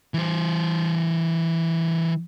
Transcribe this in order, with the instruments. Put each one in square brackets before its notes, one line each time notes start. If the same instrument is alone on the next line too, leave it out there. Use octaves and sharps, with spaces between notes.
[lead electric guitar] E3 C5